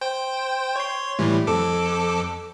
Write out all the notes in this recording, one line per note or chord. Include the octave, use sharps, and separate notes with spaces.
C5 G5
C#5 C6
A2 E3 G3
F2 A4 D6